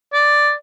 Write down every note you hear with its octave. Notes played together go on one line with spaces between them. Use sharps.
D5